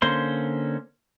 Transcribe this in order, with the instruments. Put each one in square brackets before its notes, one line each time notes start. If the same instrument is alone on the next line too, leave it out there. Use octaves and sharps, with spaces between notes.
[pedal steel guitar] D3 A#3 C#4 C5 C6